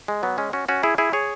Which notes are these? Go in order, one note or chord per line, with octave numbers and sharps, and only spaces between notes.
G#3
F#3 B3
G#3 C#4
C#4 F#4
C#4 F#4
E4 G#4
E4 G#4
G#4 C#5